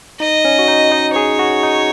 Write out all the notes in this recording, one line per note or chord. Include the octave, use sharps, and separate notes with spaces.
D#4 D#5
C#4
F#4
D#4
D#4
G#4 C#5
F#4
D#4